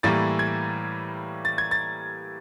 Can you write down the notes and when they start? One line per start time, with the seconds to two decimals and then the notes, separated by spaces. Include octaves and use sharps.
0.03 A2 E3 G3 A#3 A6
0.39 G#6
1.45 A6
1.58 G#6
1.71 A6